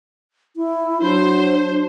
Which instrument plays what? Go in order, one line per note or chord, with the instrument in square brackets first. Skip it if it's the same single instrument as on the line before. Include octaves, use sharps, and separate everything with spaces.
[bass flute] E4
[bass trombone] F#3 [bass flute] D4 [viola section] C5